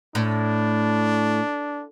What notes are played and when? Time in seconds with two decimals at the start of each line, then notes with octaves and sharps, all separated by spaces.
0.15 A2 D4